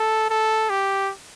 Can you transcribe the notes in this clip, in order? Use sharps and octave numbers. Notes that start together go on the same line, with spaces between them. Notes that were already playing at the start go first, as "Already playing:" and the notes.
Already playing: A4
A4
G4